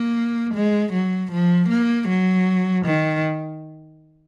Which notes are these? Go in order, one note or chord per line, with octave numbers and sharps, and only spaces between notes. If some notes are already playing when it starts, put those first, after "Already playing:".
Already playing: A#3
G#3
F#3
F3
A#3
F#3
D#3